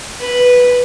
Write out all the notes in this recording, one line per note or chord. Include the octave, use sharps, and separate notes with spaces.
B4